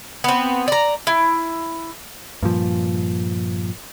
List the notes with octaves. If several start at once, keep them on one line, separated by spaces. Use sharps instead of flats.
B3 C4
D5 A#5
E4
G2 A#2 F3